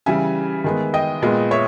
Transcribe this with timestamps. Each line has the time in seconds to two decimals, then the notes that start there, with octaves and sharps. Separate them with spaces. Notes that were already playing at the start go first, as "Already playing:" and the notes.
0.06 C#3 E3 G3 E5 G#5
0.64 D#3 G#3 B3
0.94 D#5 G5
1.22 A#2 G#3 B3
1.51 C#5 E5